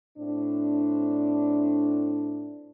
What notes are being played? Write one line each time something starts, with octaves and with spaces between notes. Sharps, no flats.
A2 C4 D4